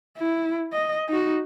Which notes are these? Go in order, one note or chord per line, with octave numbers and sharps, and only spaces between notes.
E4
D#5
D#4 F#4